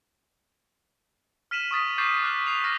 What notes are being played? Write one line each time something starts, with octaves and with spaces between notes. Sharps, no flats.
F6 B6 D#7 E7 F#7
C#6 D#6 A6 B6
C#6 D6 G6 A6 C7 E7
D6 F6 F#6 B6
D#6 C7 F7
C#6 D#6 F6 A#6 B6